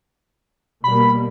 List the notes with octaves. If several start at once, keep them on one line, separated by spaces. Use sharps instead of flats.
B2 G3 A#3 B5